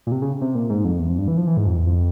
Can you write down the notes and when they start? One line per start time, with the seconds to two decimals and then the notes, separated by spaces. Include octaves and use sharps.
0.07 A#2
0.12 C3
0.22 C#3
0.41 C3
0.55 A#2
0.70 G#2
0.85 F2
0.99 E2
1.09 F2
1.19 G2
1.28 E3
1.37 F3
1.47 E3
1.57 G#2
1.67 F2
1.77 E2
1.86 F2